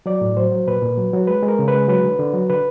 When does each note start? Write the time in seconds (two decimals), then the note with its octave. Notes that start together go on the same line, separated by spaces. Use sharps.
0.06 F#3 D5
0.21 A2
0.37 F#3 C5
0.52 F#3
0.67 A#2 B4
0.82 A#2
0.98 F#3
1.13 F#3
1.27 G#3 B4
1.43 G#3
1.48 A#4
1.59 C#3
1.68 B4
1.74 G#3
1.88 F#3 B4
2.04 D3
2.19 D3
2.34 F#3
2.50 D3 B4